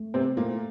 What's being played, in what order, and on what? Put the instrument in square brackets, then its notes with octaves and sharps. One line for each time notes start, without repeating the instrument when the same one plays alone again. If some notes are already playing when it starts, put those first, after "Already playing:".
Already playing: [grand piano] A3
[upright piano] C3 C4 [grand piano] C5
[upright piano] A#2 A#3 [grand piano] A3